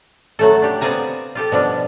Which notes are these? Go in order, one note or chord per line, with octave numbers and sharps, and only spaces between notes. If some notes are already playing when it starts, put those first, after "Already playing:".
F#3 A3 A4
D4 G4
B3 C4 D5 F5 G#5 A#5
F4 G4 A4
B2 F3 G3 D4